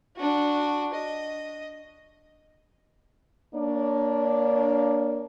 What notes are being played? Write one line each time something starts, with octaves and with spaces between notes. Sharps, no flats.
D4 F#4
D#5
A#3 D4 C#5